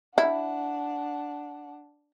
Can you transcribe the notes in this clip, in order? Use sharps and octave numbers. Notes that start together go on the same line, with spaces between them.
D4 E4 F#5